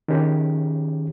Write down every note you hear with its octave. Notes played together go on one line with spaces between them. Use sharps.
D#3 F3 C#4 G4 G#4